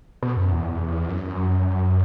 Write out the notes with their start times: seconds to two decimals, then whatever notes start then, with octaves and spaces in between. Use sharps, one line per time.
0.23 B2
0.37 F#2
0.51 E2
1.09 F#2